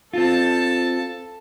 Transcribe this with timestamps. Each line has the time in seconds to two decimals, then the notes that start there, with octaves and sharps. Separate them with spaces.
0.14 C4 F4 A4 A5